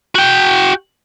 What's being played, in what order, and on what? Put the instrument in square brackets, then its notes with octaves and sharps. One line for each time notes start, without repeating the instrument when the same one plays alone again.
[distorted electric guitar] F#4 G5